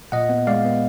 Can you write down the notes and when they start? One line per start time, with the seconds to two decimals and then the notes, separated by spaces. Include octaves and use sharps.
0.12 A#2 D#5 F#5
0.29 B3
0.47 G#3 D5 F5
0.65 B3